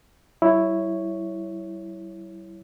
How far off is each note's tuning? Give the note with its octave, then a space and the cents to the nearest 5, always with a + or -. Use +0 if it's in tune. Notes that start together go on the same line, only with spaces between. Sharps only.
G3 -45 E4 +0 C#5 +0